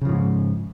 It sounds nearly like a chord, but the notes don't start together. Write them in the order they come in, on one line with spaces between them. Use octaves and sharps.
C#3 F3 G#2